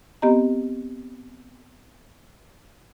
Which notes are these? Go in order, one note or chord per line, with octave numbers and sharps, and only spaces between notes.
B3 C4 G4 D#5 A#5